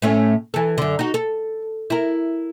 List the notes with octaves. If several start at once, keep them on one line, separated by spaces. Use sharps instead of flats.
A2 A3 C#4
E3 A4
F#2 D3
D#4 F#4
A4
E4 A#4